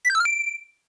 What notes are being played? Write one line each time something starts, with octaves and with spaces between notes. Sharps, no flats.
B6
G6
E6
F6
D7